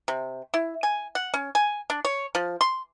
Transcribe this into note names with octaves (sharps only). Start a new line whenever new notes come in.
C3
E4
G#5
F#5
C#4
G#5
D4
C#5
F3
C6